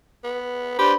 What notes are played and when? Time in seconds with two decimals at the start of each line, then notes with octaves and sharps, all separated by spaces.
0.24 B3
0.79 D4 G4 B4 C5 B5